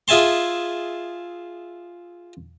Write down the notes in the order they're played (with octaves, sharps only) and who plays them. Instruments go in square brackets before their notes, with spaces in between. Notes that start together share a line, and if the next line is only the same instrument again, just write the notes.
[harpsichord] F4 G#4 E5 G#5 A5 C6